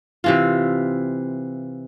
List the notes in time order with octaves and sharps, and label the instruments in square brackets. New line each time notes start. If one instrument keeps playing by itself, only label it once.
[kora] C3 E3 F4